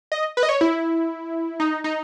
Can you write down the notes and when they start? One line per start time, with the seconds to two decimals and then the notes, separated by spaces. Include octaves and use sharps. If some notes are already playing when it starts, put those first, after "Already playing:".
0.12 D#5
0.37 B4
0.43 D#5
0.49 C#5
0.61 E4
1.60 D#4
1.84 D#4